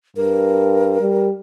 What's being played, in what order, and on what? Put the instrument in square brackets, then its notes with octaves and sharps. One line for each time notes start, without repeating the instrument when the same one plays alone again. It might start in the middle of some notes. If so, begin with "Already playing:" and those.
[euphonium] G2 [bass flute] A#4
[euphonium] G3